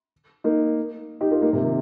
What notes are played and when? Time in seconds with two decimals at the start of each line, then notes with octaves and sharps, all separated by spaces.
0.44 A#3 D#4
1.21 D#4 G4
1.31 F4 A#4
1.41 A#3 D#4
1.53 C3
1.63 D#3